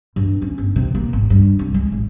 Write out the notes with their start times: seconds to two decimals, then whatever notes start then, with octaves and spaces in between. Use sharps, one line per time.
0.16 G2
0.42 C#4
0.58 G1
0.76 C3
0.95 A#3
1.13 G#1
1.30 G2
1.59 C2
1.74 G#3
1.92 A1